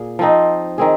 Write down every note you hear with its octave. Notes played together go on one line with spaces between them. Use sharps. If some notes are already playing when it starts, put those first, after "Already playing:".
Already playing: A#2 G#4
F3 C4 D#4
D#3 C4 G#4